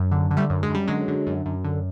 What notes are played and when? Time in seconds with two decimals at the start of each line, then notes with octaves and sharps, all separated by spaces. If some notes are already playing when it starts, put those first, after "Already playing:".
Already playing: F#2
0.12 D3
0.31 D3
0.37 G3 A3
0.50 F#2
0.63 G#3
0.69 F#2
0.75 G3
0.88 D3 F#3 G#3
1.08 D3
1.27 F#2
1.46 F#2
1.64 D3